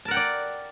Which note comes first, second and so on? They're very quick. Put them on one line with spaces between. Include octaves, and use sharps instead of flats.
A5 A#4 F#5 G5 D5